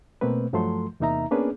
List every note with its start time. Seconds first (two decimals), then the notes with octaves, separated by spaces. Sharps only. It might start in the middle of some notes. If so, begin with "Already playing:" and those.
0.21 B2 A3 A#3 C4 B4
0.53 G2 F3 F#3 A3 A4 C6
1.00 E2 C3 A#3 D#4 E5 A#5
1.31 A#3 B3 C#4 D4 G#4 B4